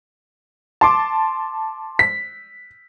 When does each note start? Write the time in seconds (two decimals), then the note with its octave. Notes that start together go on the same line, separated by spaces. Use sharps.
0.81 A5 C6 D6
1.99 B6